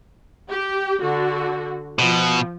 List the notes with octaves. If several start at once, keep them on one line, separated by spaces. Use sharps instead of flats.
G4
D3 F#4
B2 F3